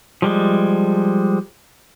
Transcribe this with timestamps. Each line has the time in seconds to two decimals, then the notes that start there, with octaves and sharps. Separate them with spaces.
0.22 F3 G3 G#3